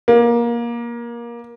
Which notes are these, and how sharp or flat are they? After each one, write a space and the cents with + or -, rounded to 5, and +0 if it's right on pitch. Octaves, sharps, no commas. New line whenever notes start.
A#3 +20